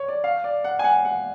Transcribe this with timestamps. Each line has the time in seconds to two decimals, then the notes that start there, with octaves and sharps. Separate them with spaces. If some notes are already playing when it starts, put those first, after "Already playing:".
Already playing: C#5
0.09 D5
0.24 F5
0.44 D5
0.64 F#5
0.79 G#5
0.84 F#5
1.05 F#5